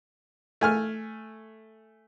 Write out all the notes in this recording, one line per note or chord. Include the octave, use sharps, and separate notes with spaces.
A3 G#5 F6